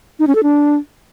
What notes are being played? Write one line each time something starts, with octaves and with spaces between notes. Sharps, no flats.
D#4
C#4
A4
D4